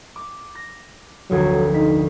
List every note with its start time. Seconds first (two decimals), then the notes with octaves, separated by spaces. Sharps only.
0.16 D6
0.55 A#6
1.30 F1 D2 F#3 G#6
1.74 D#4 B6